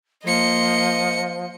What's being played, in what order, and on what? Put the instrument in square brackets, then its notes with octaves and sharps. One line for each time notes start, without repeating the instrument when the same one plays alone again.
[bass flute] F3 [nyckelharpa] A#3 C6 [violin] D#5 C#7